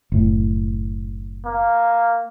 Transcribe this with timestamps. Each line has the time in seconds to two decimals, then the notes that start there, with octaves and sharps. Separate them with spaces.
0.12 F#1 A2
1.45 A#3